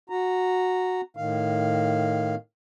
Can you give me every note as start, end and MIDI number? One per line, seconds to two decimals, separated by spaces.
0.10 1.01 66
0.10 1.01 82
1.17 2.35 45
1.17 2.35 51
1.17 2.35 77